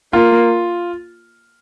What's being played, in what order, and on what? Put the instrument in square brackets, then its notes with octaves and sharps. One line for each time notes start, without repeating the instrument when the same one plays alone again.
[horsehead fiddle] A#3 [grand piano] F4